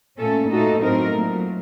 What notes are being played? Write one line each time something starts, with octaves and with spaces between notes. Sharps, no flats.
A#2 A3 C#4 A4
A#2 A3 D#4 F#4 A4
A2 F#3 C4 D#4 A#4
A#2 F#3 A3